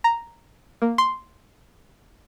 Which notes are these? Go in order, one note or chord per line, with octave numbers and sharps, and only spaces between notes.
A#5
A#3
C6